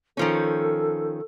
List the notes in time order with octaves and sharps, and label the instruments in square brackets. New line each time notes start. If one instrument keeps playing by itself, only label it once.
[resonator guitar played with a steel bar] D#3 F3 C#4 [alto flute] A4